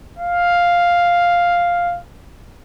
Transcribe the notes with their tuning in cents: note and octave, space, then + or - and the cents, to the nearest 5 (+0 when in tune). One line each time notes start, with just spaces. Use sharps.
F5 +0